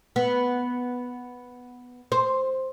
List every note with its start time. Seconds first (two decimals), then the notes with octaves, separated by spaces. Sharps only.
0.16 B3
2.12 C5